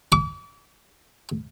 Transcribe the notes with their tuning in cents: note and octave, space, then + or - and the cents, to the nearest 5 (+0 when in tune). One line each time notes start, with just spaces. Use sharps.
D6 -40